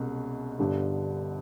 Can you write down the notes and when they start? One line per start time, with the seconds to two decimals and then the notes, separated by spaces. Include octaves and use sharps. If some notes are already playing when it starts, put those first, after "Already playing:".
Already playing: C2 B2 G#3 C#4
0.59 G1 G2 D3